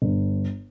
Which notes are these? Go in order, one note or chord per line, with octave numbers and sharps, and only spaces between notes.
G1